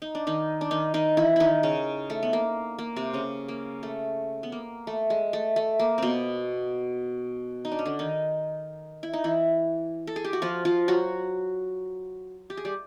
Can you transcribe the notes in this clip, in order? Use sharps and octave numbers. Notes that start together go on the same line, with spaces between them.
D#4
D4
D#3 D#4
D4
D#3 D#4
D#3 D#4
E3 E4
D#3 D#4 E4
C#3 C#4
A3
B3
A#3
A#3
C3 C4
C#3 C#4
A#3
A3
B3
A#3
A3
G#3
A3
A3
A#3
B2 B3 C4
D#4
D4
C#4
D3 D4
D#3 D#4
E4
D#4
E3 E4
A4
G#4
G4
F#4
F3 F4
F3 F4
F#3 F#4
G4
G#4
G3 G4